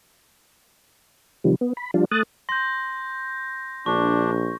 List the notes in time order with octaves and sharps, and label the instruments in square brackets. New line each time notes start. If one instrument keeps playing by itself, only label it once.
[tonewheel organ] C3 D#3 F3 G3
B3
B5
F3 G3 D4 F4
A3 D#6 F#6 A6
[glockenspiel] C6 [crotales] G6 A#6
[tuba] A#1 [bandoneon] D4 [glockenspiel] C#6